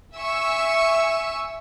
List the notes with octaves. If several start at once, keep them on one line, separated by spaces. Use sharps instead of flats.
E5 G#5 C#6 E6